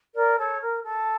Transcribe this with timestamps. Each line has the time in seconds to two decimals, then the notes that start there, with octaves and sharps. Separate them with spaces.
0.15 A#4 D5
0.38 A4 C#5
0.61 A#4
0.85 A4